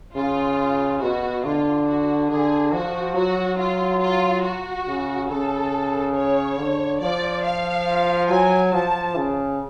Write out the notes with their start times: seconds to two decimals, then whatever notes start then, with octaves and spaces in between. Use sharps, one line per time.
0.16 C#3 F4
1.02 B2 F#4
1.45 D3 F4
1.88 F#4
2.30 D3 G#4
2.73 F3 F#4
3.16 F#3 F#4
3.59 F4
4.02 F4
4.44 F#4
4.88 C#3
5.30 C#3 A4
6.16 C#5
6.59 D3
7.01 F3 D5
7.45 F5
8.30 F#3 G#5
8.73 F3 A5
9.16 C#3